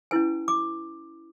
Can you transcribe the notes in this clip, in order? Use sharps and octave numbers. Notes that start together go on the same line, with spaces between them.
C#4 E4 B4 G#5
D6